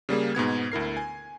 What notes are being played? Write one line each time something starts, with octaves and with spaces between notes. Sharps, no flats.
C#3 G3 A#3 G#4
G#2 B2 B3 G#6
D2 E4 A#4 C7
G#5